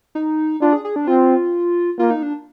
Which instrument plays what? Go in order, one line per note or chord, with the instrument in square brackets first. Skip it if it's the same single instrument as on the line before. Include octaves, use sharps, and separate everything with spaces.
[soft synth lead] D#4
[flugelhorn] D4 [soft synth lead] F4
[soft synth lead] G#4
G#4
D4
[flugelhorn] C4 [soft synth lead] F4
[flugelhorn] A#3 [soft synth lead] F4
[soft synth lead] D#4
D4